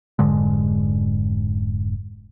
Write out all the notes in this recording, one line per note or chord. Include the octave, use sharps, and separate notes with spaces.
F1 G#2 D3 G#3